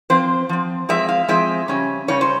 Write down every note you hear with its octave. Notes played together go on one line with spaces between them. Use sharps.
F3 C4 C5
F3 C4
F3 G#3 C4 E5
F5
F3 G#3 C4 E5
C#3 G3 C#4
C#3 G3 C#4 C#5
C5